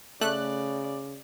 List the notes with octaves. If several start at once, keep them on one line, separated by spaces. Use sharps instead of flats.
C#3 A3 D5 F#6